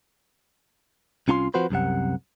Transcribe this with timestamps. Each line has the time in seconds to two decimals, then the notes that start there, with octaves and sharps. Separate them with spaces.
1.28 C2 C#4 F4 A5 C6
1.54 F3 C4 F#4 B4 C5
1.70 C2 F#2 C3 F#5